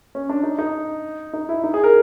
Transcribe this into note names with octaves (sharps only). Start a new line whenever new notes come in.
C#4
D4
D#4
D#4
D#4
E4
D#4
G#4
A#4